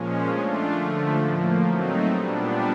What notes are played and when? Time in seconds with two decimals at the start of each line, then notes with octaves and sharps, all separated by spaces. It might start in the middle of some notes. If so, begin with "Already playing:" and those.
Already playing: A#2 F3 G#3 C#4
0.28 A3 D4 F4
0.72 D3 F3 A3
1.17 A2 F3 A#3
1.61 F#3 A3 C4 D#4
2.05 A#2 G3 B3 D4